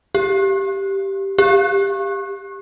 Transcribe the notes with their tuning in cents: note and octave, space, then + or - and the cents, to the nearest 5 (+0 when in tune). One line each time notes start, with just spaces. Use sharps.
G4 -5
G4 +15